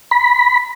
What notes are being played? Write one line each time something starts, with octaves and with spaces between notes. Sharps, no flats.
B5